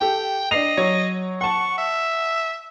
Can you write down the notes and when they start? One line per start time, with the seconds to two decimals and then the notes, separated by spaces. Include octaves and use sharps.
0.01 G4 A4 G5
0.51 D4 D#5 C7 F7
0.77 F#3 C#5
1.41 F#5 A5 C#6
1.78 E5